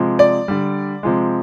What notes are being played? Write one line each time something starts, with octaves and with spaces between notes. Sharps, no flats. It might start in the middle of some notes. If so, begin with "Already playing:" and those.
Already playing: C3 F3 G#3
D5
D3 G3
C3 F3 G#3